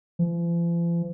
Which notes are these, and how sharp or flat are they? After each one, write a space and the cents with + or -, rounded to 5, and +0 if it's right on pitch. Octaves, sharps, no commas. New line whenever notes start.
F3 -45